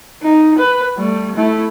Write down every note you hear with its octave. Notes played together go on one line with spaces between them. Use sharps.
D#4
B4
G3 A3
A3 E4